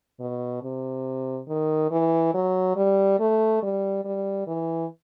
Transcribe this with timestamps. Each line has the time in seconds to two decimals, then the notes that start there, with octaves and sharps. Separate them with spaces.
0.20 B2
0.63 C3
1.48 D#3
1.91 E3
2.34 F#3
2.76 G3
3.20 A3
3.62 G3
4.05 G3
4.47 E3